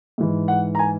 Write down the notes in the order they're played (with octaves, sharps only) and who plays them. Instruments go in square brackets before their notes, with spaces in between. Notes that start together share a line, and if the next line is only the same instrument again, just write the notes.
[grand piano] G#2 E3
F#5
A#5
G#5